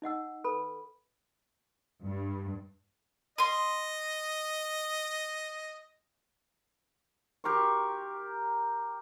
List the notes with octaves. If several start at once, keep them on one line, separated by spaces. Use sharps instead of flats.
D#4 D#5 F#5 E6
A4 B4 B5
G2
D#5 C6 D#6
G4 A#4 C6 C#6